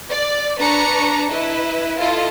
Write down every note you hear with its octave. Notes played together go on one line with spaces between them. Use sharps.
D5
D4 B4 A#5 C#6 C#7
E4 B4 D#5
E4 F4 A4 D#5 F5